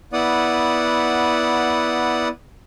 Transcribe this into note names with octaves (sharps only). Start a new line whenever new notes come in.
B3 E4 D5 F#5 D#6